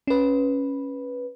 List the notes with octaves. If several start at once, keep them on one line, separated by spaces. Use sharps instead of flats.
C#4 B4